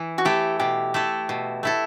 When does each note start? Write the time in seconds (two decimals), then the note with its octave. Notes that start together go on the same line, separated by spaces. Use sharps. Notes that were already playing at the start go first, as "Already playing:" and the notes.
Already playing: E3 E4
0.18 F#4
0.25 A3 E4 G4 A4
0.60 B2 G4
0.94 A3 E4 A4
1.29 B2
1.63 A3 E4 A4